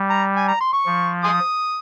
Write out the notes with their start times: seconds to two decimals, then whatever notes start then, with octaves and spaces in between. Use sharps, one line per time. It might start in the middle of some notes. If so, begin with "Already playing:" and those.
Already playing: G3
0.10 A#5
0.36 G#5
0.48 A#5
0.61 C6
0.73 C#6
0.86 F3
1.24 G#5 C6 D#6